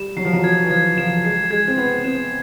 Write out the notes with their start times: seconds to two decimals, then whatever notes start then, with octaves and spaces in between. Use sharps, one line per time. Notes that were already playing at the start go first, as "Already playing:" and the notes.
Already playing: G3 E7
0.16 F#3 C7
0.25 F3
0.33 F#3
0.43 F3 G#6
0.63 E3
0.70 F3 G#6
0.97 F3 E7
1.24 G#3 C7
1.51 G#3 G#6
1.68 C4
1.77 B3 G#6
2.04 C4 E7